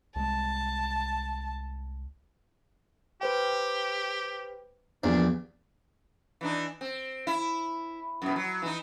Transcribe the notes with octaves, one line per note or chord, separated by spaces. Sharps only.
C2 G#3 A5
G4 B4 C5 G5
A#1 E2 G2 D4
E3 D4 D#4
C4
E4
F#2 B2
F#3
E3 D#4